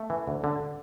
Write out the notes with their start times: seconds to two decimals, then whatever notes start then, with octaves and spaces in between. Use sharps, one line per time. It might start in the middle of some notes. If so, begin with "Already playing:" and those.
Already playing: A3
0.10 E3
0.27 D2
0.44 D3